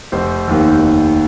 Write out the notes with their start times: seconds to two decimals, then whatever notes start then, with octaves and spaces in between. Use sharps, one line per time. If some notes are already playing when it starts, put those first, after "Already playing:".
0.12 F1 C5
0.48 D#2 D#3
0.81 F1